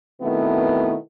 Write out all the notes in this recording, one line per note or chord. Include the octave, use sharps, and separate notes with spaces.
B2 D#3 A3 B3 C4 E4